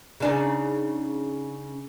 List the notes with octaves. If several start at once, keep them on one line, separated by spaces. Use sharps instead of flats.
C#3 D4 D#4